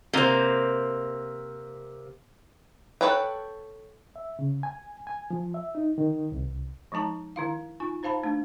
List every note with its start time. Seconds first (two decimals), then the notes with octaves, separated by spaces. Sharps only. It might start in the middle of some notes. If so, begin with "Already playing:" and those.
0.13 C3 A#3 C5 C6
3.01 A4 B4 C#5 F#5 G5
4.16 E5
4.39 C#3
4.63 G#5
5.07 G#5
5.31 F3
5.54 E5
5.75 D#4
5.98 D#3
6.32 C2
6.92 F3 G#3 D#4 A5 A#5
7.36 D#3 E4 F5
7.80 D#4 F4 G#5
8.03 D#4 C5 F5 A5 B5
8.23 A3 D4